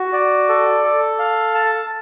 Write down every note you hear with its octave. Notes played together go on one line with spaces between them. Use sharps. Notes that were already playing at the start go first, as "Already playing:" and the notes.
Already playing: F#4
D5
A4
A4
F5
A5